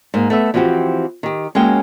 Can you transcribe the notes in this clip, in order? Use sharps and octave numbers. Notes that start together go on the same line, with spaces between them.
G#2 A#3
A3 B3 E5
E3 F3 C4 F#4 G4
D#3 G4
G#3 A#3 C#4 F#4 G5